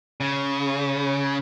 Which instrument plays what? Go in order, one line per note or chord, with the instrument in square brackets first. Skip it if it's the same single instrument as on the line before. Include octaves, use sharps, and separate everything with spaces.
[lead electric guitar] C#3